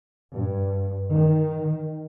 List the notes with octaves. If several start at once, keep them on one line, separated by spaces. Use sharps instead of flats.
G2
D#3